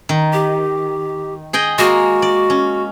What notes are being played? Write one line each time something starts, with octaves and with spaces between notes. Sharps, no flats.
D#3
G4
G#4 D#5 G5
G#3 A#3 F#4
D5
C#4